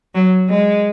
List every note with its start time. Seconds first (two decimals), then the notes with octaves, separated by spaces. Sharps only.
0.15 F#3
0.49 G#3